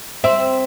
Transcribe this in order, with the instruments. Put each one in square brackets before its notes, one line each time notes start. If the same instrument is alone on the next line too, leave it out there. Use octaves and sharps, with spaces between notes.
[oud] C4 [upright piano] E5